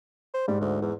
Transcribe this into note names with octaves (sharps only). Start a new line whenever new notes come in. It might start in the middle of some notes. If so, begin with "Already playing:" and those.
C5
G#2 G3
D2
E2